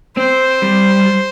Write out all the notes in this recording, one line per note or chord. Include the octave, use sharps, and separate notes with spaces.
C4 C5
G3